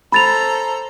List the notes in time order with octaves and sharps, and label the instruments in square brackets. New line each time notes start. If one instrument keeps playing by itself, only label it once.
[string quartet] A4 C5 A#5 [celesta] B5 A6 F7